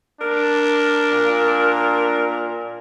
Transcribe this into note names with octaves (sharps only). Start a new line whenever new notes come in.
D4 A#4
A#2